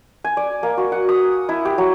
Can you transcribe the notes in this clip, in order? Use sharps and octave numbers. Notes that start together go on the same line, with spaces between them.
G#5
D5
A#3
F#4
F#5
D#6
E4
G4
F#3